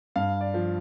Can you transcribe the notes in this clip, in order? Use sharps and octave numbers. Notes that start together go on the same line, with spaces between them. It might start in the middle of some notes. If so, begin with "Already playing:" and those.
G2 F5
D5
F3